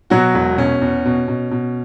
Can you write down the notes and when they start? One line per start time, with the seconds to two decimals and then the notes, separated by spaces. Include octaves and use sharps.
0.10 B2 F#3 F#4
0.34 E1
0.57 B2 C#4
0.81 E2
1.05 B2
1.28 B2
1.51 B2